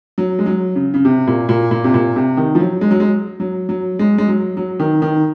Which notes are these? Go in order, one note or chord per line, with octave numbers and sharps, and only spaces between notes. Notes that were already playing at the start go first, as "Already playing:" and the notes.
F#3
G#3
F#3
C#3
C#3
C3
A#2
A#2
A#2
C3
A#2
C3
D#3
F3
F#3
G#3
F#3
G#3
F#3
F#3
G#3
G#3
F#3
F#3
D#3
D#3